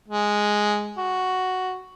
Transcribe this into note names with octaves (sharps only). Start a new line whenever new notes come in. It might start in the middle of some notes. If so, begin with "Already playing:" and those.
G#3
F#4